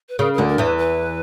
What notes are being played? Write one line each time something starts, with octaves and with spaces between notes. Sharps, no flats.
B4
C#3 A#4
D2 D3 A#4
A#4
E2 E3 B4
B4